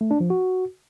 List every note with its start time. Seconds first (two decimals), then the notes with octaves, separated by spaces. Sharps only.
0.01 A3
0.11 D4
0.20 F3
0.30 F#4